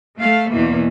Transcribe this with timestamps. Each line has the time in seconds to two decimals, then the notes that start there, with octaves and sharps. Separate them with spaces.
0.18 A3 F5
0.51 E2 B2 E3 A#3